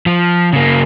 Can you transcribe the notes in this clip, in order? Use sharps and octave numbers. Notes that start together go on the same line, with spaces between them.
F3
C#3 A#3